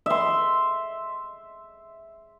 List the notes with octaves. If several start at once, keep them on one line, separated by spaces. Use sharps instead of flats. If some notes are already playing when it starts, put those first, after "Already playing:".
E5 C6